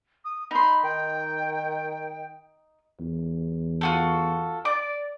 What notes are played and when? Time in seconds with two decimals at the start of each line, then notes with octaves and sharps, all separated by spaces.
0.25 D#6
0.51 D#4 B5 C6
0.84 D#3 G5
3.00 E2
3.81 F4 F#4 A4
4.65 D5 D6